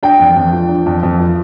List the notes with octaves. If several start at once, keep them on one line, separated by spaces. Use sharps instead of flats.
D4 G5
F2
F2
F3
D4
F2
F2
F3